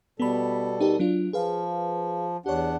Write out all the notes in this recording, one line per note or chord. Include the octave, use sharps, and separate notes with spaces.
B2 G3 B3 A4 B5
D#4 G4 A#4
F#3 D4 F4
F3 G#4 B4 F5
E2 D4 G4 C#5 F#5